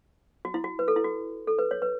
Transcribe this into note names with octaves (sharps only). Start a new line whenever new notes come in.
F#4
E4
F#4
B4
A4
E4
F#4
A4
B4
C#5
B4